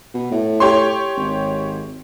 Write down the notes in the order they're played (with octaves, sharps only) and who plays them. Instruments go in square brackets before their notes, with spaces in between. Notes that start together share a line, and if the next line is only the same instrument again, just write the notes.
[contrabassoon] B2
A2
[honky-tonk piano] G4 C#5 C6
[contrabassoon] G#1